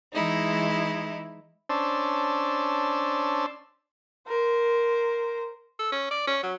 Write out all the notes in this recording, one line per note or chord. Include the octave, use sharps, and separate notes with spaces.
E3 G#3 D#4 E4
C#4 D4 C5 A5 E6
A#4 C5
A4
C#4
D5
C#4
F#3